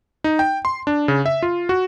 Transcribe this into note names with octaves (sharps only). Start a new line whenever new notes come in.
D#4
G5
C6
D4
C#3
E5
F4
F#4